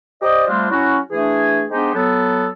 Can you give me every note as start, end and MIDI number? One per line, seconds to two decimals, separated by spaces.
0.21 0.47 67
0.21 0.47 72
0.21 0.47 74
0.21 0.47 75
0.48 0.66 53
0.48 0.66 55
0.48 0.66 57
0.48 0.66 60
0.48 0.66 62
0.48 0.66 65
0.71 0.98 54
0.71 0.98 61
0.71 0.98 64
0.71 0.98 66
1.11 1.64 52
1.11 1.64 57
1.11 1.64 62
1.11 1.64 68
1.70 1.93 56
1.70 1.93 59
1.70 1.93 62
1.70 1.93 63
1.70 1.93 67
1.70 1.93 72
1.94 2.46 54
1.94 2.46 59
1.94 2.46 69